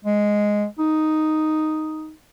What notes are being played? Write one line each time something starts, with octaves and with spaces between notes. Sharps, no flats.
G#3
D#4